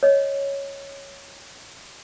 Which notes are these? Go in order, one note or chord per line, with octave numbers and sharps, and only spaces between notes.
C#5 D#5